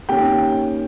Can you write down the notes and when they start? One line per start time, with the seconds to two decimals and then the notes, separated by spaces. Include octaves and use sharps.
0.09 D#3 A#3 C#4 G4 G5